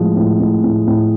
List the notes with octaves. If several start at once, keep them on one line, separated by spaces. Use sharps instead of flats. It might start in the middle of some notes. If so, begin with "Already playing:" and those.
Already playing: A2 F3 G#3
A2
A2
A2
A2